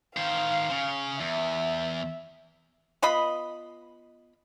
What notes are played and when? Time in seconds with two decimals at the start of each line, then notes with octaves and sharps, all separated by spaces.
0.17 D#3 C5 F5
0.71 C#3
1.20 E2 E5
3.03 B3 F4 D#5 B5